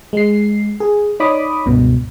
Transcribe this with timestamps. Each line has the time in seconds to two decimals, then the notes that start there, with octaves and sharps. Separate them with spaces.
0.13 G#3 C7
0.80 G#4
1.20 D#4 C#5 D5 B5 D6 D#6
1.66 C#2 G2 B2